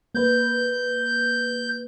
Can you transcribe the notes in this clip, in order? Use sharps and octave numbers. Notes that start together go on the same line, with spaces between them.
A#3 B4 G6